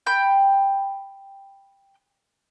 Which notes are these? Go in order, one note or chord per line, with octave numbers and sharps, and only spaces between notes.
G5 B5 G6